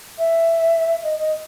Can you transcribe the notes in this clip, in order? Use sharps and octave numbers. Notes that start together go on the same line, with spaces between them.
E5
D#5
D#5